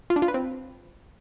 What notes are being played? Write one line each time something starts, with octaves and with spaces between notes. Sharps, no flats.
F4
D4
F4
B4
C4